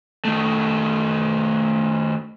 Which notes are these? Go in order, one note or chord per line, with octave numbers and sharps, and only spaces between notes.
D#3 A3